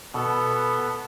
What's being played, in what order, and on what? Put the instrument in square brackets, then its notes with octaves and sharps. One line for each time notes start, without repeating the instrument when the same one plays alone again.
[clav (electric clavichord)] B2 [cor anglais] B3 [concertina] A4